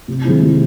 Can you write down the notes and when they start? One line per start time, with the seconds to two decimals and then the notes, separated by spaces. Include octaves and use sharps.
0.08 C3
0.25 D#3 G#3 C4 E4
0.42 C3